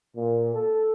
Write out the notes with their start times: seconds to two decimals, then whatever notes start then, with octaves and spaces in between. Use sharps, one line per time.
0.15 A#2
0.53 A4